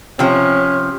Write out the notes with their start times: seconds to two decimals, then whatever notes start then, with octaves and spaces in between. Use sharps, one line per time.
0.19 C3 F3 C#4